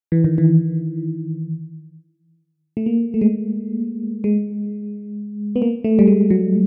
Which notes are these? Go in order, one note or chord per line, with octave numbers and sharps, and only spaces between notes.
E3
D#3
E3
A3
A#3
A3
G#3
G#3
B3
A#3
A3
G3
G#3
F#3